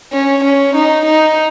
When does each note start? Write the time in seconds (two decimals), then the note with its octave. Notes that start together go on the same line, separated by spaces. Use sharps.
0.13 C#4
0.44 C#4
0.75 D#4
1.06 D#4